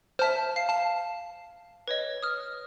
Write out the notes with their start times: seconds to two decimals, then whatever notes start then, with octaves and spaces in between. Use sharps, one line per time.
0.19 C5 E5 A5 F6
0.56 F5 C7
0.70 A5
1.88 B4 C#5 D#5
2.22 D#6 F6